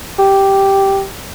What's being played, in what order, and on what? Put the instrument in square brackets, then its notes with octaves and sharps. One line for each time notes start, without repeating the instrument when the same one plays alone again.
[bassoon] G4